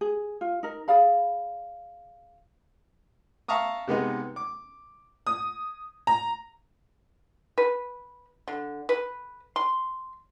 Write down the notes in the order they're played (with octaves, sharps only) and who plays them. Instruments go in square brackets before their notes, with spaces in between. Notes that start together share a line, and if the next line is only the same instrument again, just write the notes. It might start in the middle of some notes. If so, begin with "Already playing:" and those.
[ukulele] G#4
F4
D#4 A#4
G#4 D5 F5 B5
[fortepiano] E5 F5 A5 A#5 C#6 D#6
C3 G#3 B3 D#4
D6
[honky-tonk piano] D#6
A#5
[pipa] B4
D3
B4
C6